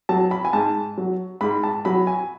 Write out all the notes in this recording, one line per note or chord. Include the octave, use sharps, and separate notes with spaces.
F#3 A5
B5
G#5
G#2 A5
F#3
G#2 B5
A5
F#3 B5
G#5